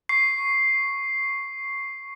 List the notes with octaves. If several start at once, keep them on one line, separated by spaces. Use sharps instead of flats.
C#6 C7